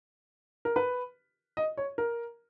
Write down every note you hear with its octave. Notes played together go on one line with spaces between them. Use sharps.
A#4
B4
D#5
C#5
A#4